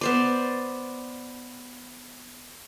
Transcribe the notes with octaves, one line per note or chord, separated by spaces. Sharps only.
B3 C5 D5